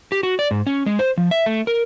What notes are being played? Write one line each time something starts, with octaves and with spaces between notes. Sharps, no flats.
G4
F#4
D5
G#2
C#4
G#3
C5
F3
E5
A3
A#4